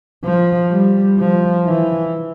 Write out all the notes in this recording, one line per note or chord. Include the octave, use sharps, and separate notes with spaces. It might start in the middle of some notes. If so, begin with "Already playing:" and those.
F3
G3
F3
E3